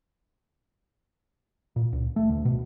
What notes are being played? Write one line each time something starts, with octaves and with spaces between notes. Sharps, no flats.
A#2
C#2
A3
D2
B2